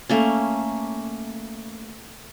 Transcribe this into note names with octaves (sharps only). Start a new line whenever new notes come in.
A3 A#3 C#4